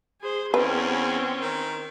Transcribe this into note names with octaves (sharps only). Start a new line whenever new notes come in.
G#4 C5
E2 C4 C#4 B4
D#3